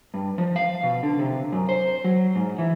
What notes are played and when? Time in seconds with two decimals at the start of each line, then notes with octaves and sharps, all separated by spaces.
0.14 G2
0.38 F3
0.56 F5
0.83 B2
1.03 D3
1.19 C3
1.52 F#2
1.69 C5
2.04 F#3
2.36 G#2
2.58 E3